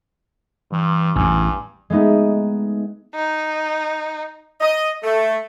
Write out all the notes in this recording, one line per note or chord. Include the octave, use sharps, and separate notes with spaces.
G2 E3
A1 E2 G2 G#5
G#3 A3 B3 D#4
D#4
D#5
A3